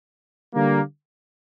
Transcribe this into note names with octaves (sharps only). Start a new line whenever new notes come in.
D3 G3 A#3